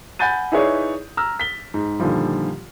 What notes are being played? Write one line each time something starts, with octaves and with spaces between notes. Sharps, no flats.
F#5 G#5 B5 G6 A6 D#7
D#4 E4 G#4 B4 C#5 D5
A#5 E6 F6
B6 G7
G#2
A#2 D3 D#3 F3 G3